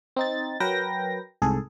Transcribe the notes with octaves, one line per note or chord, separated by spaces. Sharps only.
C4 D#4 A6
F#3 A#4 B4 G5 A#6
C2 G#2 G#4 A4